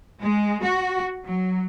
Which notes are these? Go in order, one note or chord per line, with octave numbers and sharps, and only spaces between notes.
G#3
F#4
F#3